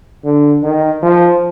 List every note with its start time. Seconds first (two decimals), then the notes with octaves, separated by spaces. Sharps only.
0.25 D3
0.63 D#3
1.02 F3